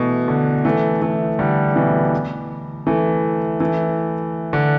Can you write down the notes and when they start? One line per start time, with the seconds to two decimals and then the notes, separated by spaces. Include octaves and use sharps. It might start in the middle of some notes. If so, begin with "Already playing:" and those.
Already playing: B2 E3 A3
0.28 D3
0.65 E3 A3
1.02 E3 A3
1.39 D3 G3
1.76 B2 E3
2.87 E3 A3
3.60 E3 A3
4.53 D3